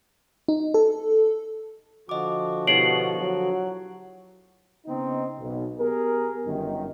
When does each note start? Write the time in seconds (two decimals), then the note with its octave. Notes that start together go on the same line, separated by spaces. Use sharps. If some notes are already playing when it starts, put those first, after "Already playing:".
0.48 D#4
0.74 A4
2.09 D3 F3 F#4 D#5 D6
2.67 B2 E4 G4 C#5 C7 D7 F#7
3.19 F#3
4.86 C#3 B3 C4 D#4
5.40 B1
5.79 B3 G4 G#4 A#4
6.46 G1 F#2 D#3